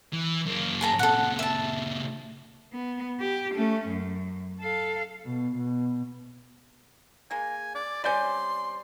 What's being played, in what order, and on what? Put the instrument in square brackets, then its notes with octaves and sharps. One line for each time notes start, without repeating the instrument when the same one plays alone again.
[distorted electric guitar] E3
F#2 A#3
[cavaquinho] G#4 A5 A#5
[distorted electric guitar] A#2 C#3 [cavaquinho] A4 F#5
[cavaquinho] E5 A5
[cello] B3
G4
A3 C#4
F#2
A4 F5
[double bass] B2
B2
[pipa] G#3 A#3 [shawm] G#5
[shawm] D5
[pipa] G3 C4 C#4 [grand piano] D5 G6 [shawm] C6